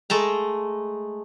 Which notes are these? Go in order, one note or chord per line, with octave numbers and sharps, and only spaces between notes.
G#3 A3 A5 A#5